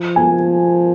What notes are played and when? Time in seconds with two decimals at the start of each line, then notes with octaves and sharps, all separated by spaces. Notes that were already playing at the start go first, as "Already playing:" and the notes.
Already playing: F3
0.16 G#5